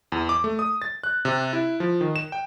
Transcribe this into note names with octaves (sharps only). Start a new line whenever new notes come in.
E2
D6
A3
D#6
A6
F#6
C3
E4
F3
D#3
E7
G5